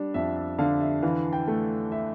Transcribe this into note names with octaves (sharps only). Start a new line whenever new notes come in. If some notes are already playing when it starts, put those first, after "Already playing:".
Already playing: G3 D4
F2 E5
E5
D3 F5
E5
E3 F5
G5
A3
E5